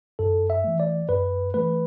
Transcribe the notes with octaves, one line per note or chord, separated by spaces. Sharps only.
F#2 A4
E5
E3 A3
D5
F#2 B4
E3 A3 B4